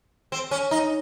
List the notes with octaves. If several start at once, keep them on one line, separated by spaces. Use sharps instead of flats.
C4
C#4
D#4